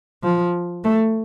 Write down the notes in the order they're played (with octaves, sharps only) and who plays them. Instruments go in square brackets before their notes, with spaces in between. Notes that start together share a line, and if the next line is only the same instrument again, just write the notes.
[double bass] F3
A3